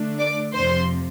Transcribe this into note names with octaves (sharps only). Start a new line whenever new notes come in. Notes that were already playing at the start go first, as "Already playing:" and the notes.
Already playing: D3 A3 D4
D5 D6
F2 C3 F3 C5 C6